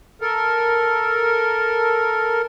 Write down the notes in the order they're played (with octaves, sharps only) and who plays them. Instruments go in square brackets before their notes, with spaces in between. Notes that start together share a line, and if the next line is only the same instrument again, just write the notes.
[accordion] A4 A#4